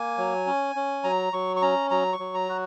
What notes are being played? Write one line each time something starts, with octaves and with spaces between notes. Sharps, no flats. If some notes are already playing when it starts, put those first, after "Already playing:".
Already playing: A#3 G#5
F#3
C#4
C#4
F#3 A#5
F#3 C#6
C#6
C#4 A#5
F#3 A#5
C#6
F#3
A#5
F#4